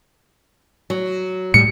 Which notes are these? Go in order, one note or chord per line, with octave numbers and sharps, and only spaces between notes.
F#3
A2 G3 C#7